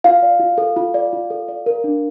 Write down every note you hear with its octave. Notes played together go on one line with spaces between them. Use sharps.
F4 F5
D5
F4
A4
F4
D5
F4
A4
D5
A#4
D4